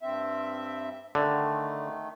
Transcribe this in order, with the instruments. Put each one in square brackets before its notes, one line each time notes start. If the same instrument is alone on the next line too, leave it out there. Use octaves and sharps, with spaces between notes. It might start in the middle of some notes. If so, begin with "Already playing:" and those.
[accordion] G2 C4 E5
[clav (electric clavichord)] D3 [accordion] D#3 A3